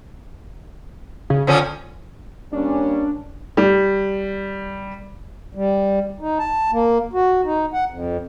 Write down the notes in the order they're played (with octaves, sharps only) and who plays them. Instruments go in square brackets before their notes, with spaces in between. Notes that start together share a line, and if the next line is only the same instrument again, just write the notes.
[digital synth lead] C#3
[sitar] F2 F3 C#4 [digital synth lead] D3
[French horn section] G3 A#3 C#4 [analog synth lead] D4
[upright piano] G3
[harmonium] G3
D#4
A5
A#3
F#4
D#4
F#5
F2